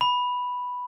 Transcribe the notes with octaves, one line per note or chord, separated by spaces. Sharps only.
B5